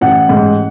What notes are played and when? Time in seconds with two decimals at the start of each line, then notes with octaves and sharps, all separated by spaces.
0.01 A1 F#5
0.29 G#2